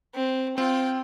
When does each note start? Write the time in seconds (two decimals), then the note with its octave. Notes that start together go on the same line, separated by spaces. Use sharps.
0.14 C4
0.58 C4 F4 G5